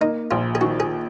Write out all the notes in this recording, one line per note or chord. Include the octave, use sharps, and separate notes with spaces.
A#3 D#4
A#1 F4
G#4
D#3 F#4
G#4